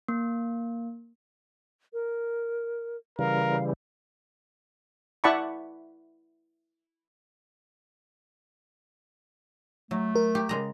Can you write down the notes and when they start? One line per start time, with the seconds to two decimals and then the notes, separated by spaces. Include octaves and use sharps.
0.08 A#3
1.93 A#4
3.19 C#3 E3 G3 A#4 F5
5.24 E4 D5 F#5 A5 B5 C#6
9.91 F#3 A3
10.15 A#4
10.35 G4
10.49 C#3 G#3 A#5